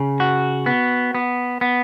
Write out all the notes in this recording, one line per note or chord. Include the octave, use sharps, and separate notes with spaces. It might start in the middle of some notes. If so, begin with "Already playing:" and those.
Already playing: C#3
F#4
B3
B3
B3